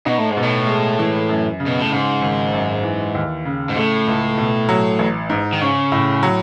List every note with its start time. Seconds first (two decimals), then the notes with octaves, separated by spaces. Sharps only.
0.06 B2 D#4
0.18 A2
0.30 G#2
0.37 B2
0.43 A2
0.67 G#3
0.99 E3
1.29 F#2
1.60 C#3
1.66 B2
1.79 A2
1.91 G#2 C#3
2.22 G#1
2.53 F#2
2.83 E3
3.15 D#2
3.45 C#3
3.69 G#2
3.76 A2 A3
4.07 C#2
4.38 B2
4.69 F#3
4.99 A1
5.30 G#2
5.53 D#3
5.61 C#3 C#4
5.92 A2
6.23 F#3